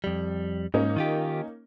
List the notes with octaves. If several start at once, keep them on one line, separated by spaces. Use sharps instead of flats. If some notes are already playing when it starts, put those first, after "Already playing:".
F2 G3
G#2 A#3 C#4 D#4
D#3 F4 G4